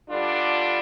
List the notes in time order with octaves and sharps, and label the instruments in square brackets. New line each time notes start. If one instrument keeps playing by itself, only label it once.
[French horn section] D3 G3 D4 F4